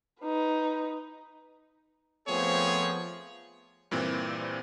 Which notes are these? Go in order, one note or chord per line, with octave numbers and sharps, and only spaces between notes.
D#4 B4
F3 A3 B3 C4 G#4 C#5
G2 A#2 E3 C4